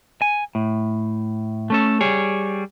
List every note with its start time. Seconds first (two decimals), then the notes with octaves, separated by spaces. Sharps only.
0.22 G#5
0.55 A2
1.70 A3 C#4 A4
2.01 G3 G#4 C#5